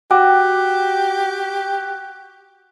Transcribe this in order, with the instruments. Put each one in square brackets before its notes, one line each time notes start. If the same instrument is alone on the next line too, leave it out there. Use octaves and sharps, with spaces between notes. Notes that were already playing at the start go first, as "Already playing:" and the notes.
[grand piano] F#4 [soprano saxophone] G4 [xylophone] G5 D6